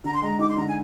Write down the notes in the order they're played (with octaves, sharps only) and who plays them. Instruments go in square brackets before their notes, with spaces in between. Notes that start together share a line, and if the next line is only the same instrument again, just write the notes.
[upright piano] D3 [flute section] A#5
[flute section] C6
[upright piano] G#3 [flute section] A#5
[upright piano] D#4 [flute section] D6
[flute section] C6
[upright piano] D3 [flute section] A#5
[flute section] G#5